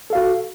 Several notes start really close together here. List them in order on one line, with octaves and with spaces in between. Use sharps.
A4 F5 F#4